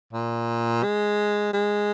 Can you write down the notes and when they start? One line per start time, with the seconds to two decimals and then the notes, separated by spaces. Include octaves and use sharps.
0.13 A#2
0.84 G#3
1.53 G#3